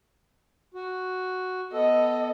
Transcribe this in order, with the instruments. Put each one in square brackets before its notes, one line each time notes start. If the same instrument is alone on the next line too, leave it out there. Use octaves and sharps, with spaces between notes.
[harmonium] F#4
[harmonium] B3 A4 [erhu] D#5